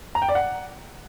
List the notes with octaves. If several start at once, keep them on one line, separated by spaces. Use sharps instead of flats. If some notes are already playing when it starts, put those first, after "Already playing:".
A#5
G5
D5
F#5